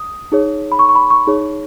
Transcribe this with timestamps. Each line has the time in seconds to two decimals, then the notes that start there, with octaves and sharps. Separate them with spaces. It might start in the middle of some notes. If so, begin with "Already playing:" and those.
Already playing: D#6
0.32 D#4 G#4 C#5
0.72 B5
0.79 C#6
0.89 C#6
0.95 B5
1.10 C#6
1.27 D#4 G#4 C#5